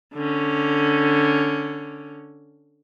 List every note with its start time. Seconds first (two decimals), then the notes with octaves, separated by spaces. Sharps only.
0.14 D3 C#4